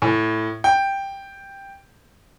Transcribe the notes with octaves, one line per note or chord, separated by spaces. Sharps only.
A2
G5